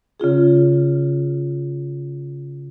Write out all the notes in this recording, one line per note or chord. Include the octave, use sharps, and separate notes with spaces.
C#3 C#4 F4 G#4